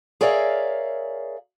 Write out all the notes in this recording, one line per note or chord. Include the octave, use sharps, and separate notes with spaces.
G#4 A#4 C#5 D5 E5 F5